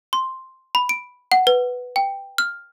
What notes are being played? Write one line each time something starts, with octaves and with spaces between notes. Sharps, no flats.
C6
B5
D7
F#5
B4
G5
F6